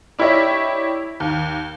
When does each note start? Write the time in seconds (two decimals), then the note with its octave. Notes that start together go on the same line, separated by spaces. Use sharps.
0.19 D4 E4 G4 C#5 D#5 E5
1.20 D#2